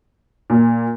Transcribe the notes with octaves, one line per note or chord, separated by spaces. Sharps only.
A#2